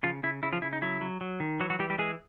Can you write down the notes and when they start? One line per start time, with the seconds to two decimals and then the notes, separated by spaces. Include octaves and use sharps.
0.03 C#3 F3 F4
0.23 C#3 E4
0.43 C#3 E4
0.53 F3 F4
0.62 C#3 E4
0.73 D#4
0.82 F#3 E4
1.01 F#3
1.21 F#3
1.40 D#3
1.60 E3 F#3 F#4
1.70 F#3 F#4
1.79 E3 G3 G4
1.90 G3 G4
1.98 E3 G#3 G#4